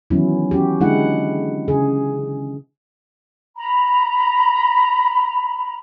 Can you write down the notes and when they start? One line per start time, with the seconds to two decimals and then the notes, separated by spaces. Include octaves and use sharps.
0.10 D#3 E3 F#3 B3 C#4 E4
0.51 C#4 F#4 G4
0.80 D3 G#3 D4 E4 F#5
1.68 C#3 G#4
3.56 A#5 B5